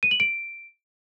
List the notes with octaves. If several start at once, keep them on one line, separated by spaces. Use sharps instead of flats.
D#7
F#7
D7